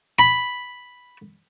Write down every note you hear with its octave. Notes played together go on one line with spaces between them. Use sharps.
B5